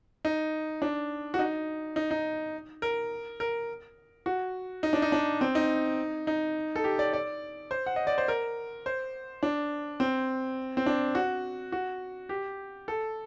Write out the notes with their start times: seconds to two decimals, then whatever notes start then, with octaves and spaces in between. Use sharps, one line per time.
0.25 D#4
0.82 D4
1.34 F#4
1.39 D#4
1.96 D#4
2.11 D#4
2.82 A#4
3.40 A#4
4.26 F#4
4.83 D#4
4.93 D4
5.02 D#4
5.12 D4
5.41 C4
5.55 D#4
6.27 D#4
6.76 A4
6.84 G4
6.99 D5
7.13 D5
7.71 C5
7.86 F#5
7.96 D#5
8.07 D5
8.18 C5
8.28 A#4
8.86 C5
9.43 D4
10.00 C4
10.77 C4
10.86 D4
11.15 F#4
11.72 F#4
12.29 G4
12.88 A4